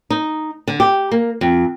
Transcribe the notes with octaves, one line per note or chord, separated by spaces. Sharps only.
D#4
D3
G4
A#3
F2